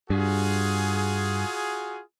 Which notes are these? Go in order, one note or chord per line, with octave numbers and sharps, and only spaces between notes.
G2 F4 F#4 G#4